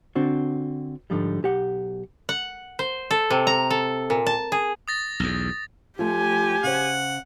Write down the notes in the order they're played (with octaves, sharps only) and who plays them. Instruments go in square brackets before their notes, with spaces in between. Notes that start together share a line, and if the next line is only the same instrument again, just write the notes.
[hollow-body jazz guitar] D3 C4 D4 F#4
G#2 D3 F3 G3
B1 G4 F#5
[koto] F#5
C5
A4
C3
A#5
A4
A#2
A5
G#4
[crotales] D#6 A6 A#6
[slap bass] B1 E2
[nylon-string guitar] F3 A3 F4 [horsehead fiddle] G4 G#5
[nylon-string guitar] C#3 C5 [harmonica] F#5